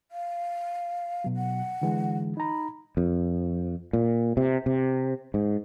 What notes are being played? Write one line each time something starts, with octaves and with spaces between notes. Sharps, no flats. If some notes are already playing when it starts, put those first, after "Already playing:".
F5
B2 F#3
F#5
D3 E3 G#3
D#4 A#5 B5
F2
A#2
C3
C3
G#2